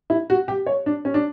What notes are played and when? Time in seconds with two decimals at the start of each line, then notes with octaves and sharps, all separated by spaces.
0.10 E4
0.30 F#4
0.48 G4
0.66 C#5
0.86 D4
1.05 C#4
1.14 D4